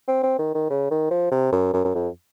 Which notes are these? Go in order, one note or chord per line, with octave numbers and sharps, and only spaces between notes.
C4
C4
D#3
D#3
C#3
D#3
F3
C3
F#2
F#2
F#2
F2